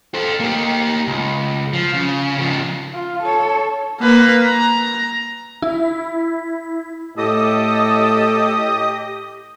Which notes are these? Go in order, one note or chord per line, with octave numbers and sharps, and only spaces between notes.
A4 C5
A#3 G4
C#2
F3
C#3
C#3 F3
F4
A4 C#5
A#3 B4
A#5
E4
A2 G4 A4 D#5 D#6